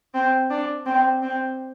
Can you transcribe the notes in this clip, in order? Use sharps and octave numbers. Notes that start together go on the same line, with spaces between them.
C4
D4
C4
C4